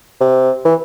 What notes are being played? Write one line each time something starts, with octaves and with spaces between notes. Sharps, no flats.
C3
E3